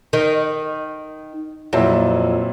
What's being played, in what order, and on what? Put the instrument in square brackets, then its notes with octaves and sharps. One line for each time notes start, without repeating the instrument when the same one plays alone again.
[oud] D#3
[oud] F2 [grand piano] A#2 F#3 E4